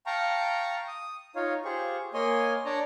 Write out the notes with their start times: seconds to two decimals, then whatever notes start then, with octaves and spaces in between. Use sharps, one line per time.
0.06 F5 G5 A5 A#5 C#6
0.88 D#6
1.36 D#4 F4 C#5 F5
1.65 F4 G4 G#4 C5 C#6
2.14 A#3 C#5 D#5 G#5 C6
2.65 D4 C#5 D5 A5 A#5